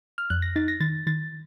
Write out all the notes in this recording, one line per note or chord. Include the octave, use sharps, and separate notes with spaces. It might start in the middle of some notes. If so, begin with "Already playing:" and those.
F6
F2 F#6
A#6
D#4 A6
A#6
D#3 A6
D#3 A6